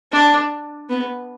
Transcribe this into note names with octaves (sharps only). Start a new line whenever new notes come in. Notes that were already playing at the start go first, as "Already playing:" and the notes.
D4
B3